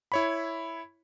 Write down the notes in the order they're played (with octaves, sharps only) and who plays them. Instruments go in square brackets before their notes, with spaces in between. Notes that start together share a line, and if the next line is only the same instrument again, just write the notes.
[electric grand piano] E4 C#5 B5